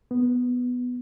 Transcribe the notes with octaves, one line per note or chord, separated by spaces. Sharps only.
B3